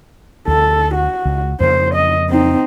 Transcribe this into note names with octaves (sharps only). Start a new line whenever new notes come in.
D2 A4
F#4
C#2
F2 C#3 A#3 C5
D#5
C4 D#4